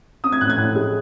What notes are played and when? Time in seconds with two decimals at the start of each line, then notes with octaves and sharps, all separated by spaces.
0.24 C4 D#6
0.32 G#6
0.41 A2 F#6
0.50 G#6
0.58 A2 F#6
0.76 G#3